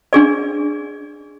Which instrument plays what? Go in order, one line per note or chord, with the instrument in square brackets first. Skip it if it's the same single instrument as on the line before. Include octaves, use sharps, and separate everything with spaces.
[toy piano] D4 G#4 D5